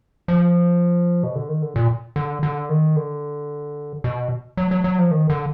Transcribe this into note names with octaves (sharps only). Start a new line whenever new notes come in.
F3
B2
D3
D#3
D3
A#2
D3
D3
D#3
D3
B2
F#3
F#3
F#3
F3
D#3
D3